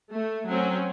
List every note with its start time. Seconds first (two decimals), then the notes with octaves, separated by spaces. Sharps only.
0.11 A3
0.47 F#3 C4 C#4